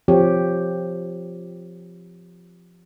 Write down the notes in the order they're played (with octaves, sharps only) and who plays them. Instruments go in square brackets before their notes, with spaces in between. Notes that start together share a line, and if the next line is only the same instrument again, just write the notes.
[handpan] F3 C4 G4 C#5